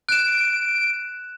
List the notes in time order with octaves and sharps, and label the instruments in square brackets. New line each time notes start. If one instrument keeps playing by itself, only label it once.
[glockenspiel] F#6 E7 [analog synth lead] D7